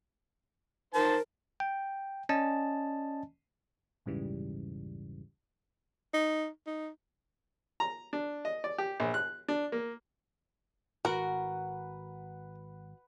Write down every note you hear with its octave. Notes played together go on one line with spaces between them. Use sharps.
D#3 A#4 C5 A5
G5
C#4 D5 D#5 G#5 A5
A#1 E2 G#2 C#3 E3 G3
D#4
D#4
A#5
D4
D#5
D5
G4
A#1
F#6
D4
A#3
G#1 F#4 A#4 B4 F#5